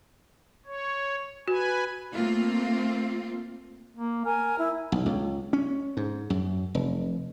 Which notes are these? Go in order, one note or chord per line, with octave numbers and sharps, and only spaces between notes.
C#5
F#4 B4 G#5
A3 A#3 C4 F4
A#3
A#4 G#5
E4
B1
C#2
C#4
G#2
F#2
F1